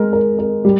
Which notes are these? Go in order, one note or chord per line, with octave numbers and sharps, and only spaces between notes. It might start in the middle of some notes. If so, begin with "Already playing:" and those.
Already playing: G#3 A#4
A#4
A#4
G3